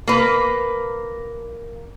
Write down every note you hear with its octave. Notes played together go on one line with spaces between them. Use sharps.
A#3 B4